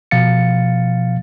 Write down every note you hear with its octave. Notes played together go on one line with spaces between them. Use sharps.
B2 F3 F5 A6 C#7